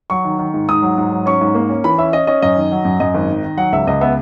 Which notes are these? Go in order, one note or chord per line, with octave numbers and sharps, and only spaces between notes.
F#3 C#6
D#3
D#3
G#2
G#2 D#6
F#3
G#2
F#3
C#4 C#6
G#2
A#3
C#4
E3 B5
C#4 E5
C#4 D#5
C#4 D#5
F#2 D#5
D#3
F#3
F#2
F#2 D#5
G#1
D#3
D#3
F#3 F#5
C#2 E5
C#2 D#5
B3 E5